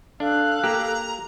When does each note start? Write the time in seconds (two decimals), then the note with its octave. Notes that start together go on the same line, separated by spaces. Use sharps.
0.20 D4 A4 F5 F#6
0.64 A#3 G4 A#5